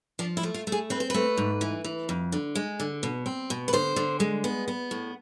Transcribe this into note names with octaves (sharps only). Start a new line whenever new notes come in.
F3 D4
E4
A3
F4
A3
G#4
C4 B4
C5
A3 B4
G#2
E3
E3
F2
D3
G#3
D3
B2
C4
B2
B4
D3 C5
D3
G#3
B3
B3
A2